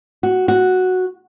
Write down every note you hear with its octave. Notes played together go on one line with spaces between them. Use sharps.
F#4
F#4